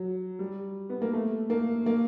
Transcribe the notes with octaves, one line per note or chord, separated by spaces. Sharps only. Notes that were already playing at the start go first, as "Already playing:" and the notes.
Already playing: F#3
G3
B3
A#3
A3
A#3
A#3